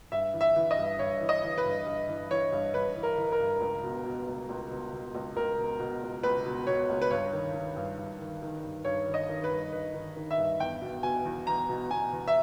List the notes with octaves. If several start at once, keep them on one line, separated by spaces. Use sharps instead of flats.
G2 E5
E3
E5
E3
D#5
G2
G2 C#5
E3
D#5
E3
B4
G2
G2
E3
E3 C#5
G2
G2 B4
E3
A#4
E3
A#4
G2
C#2
B2
B2
C#2
C#2
B2
B2
C#2
C#2 A#4
B2
B2
C#2
C#2 B4
B2
B2 C#5
C#2
B4
G2 C#5
D#3
D#3
G2
G2
D#3
D#3
G2
G2 C#5
D#3
D#5
D#3
B4
G2
G2 B4
D#3
D#3
E5
G2
E2 G5
B2
B2 G#5
E2
E2 A#5
B2
B2 G#5
E2
E5